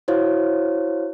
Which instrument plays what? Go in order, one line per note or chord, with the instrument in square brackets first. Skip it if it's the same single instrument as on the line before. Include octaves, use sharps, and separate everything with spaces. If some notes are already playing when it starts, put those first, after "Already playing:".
[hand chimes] E4 F#4 C5 C#5 F5